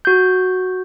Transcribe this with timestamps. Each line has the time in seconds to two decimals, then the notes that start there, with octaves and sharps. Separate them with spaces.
0.05 F#4 G6